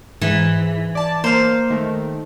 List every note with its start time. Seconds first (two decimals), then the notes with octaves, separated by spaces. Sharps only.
0.21 G#2 E3 B6
0.95 D5 A5
1.24 A#3 C5 F5
1.70 D#3 A3